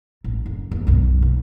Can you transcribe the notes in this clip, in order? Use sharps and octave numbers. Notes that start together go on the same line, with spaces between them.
A1
F#1
D#2
B1 F#2
B1